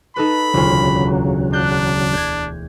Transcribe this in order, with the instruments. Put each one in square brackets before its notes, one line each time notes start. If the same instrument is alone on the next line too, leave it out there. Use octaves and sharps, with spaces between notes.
[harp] D#4 A4 B4 [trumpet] B5
[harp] E1 D2 F4 [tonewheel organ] C#3 F#3
[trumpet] D4 [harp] F#6 G6
[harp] G6 G#6